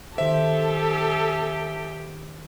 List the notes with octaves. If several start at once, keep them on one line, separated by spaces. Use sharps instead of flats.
D#3 G4 A4 C5 E5